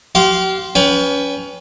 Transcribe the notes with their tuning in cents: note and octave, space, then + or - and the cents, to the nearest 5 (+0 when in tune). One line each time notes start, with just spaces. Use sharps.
G4 -40 F5 +0 C6 +5
C#4 +25 B4 +0 G5 +25